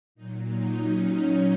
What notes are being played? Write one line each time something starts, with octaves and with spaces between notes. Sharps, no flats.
A#2 F#3 D#4
D#4
C#4
D#4